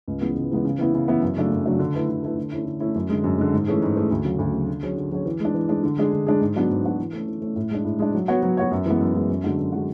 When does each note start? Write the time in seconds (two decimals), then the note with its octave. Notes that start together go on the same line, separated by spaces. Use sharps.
0.08 C#2
0.21 C#3 E3 G#3 B3
0.36 C#2
0.50 C#3 E3 G#3 B3
0.65 C#3
0.78 E3 B3 E4
0.94 C#3
1.08 E3 B3 E4
1.22 F#2
1.37 C#3 F#3 A3 D4
1.51 F#2
1.66 C#3 F#3 A3 D4
1.79 D3
1.94 A3 E4 B4
2.09 D3
2.23 A3 E4 B4
2.37 D3
2.52 A3 C#4 E4
2.66 D3
2.80 A3 C#4 E4
2.95 F#2
3.09 D3 G#3
3.24 F#2
3.38 D3 G#3
3.52 G#2
3.68 E3 A3 C#4 G#4
3.82 G#2
3.96 E3 A3 C#4 G#4
4.11 D2
4.25 C#3 F#3
4.39 D2
4.53 C#3 F#3
4.69 D3
4.83 F#3 C#4 G#4 C#5
4.97 D3
5.12 F#3 C#4 G#4 C#5
5.26 E3
5.40 G#3 D4
5.54 E3
5.69 G#3 D4
5.83 D3
5.98 G#3 D4 G#4
6.13 D3
6.27 G#3 D4 G#4
6.41 G#2
6.56 F#3 B3 D4 F#4
6.70 G#2
6.84 F#3 B3 D4 F#4
6.98 E3
7.13 A3 C#4
7.28 E3
7.42 A3 C#4
7.56 A2
7.71 G#3 D4
7.85 A2
7.99 G#3 D4
8.15 F#3
8.28 B3 F#4 C#5
8.43 F#3
8.57 B3 F#4 C#5
8.71 F#2
8.86 E3 G#3 B3
9.01 F#2
9.15 E3 G#3 B3
9.29 F#2
9.44 D3 G#3 D4 F#4
9.58 F#2
9.72 D3 G#3 D4 F#4